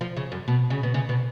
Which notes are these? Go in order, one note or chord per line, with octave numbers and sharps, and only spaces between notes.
F3
C#3
F#2
B2
C#3
B2
C#3
B2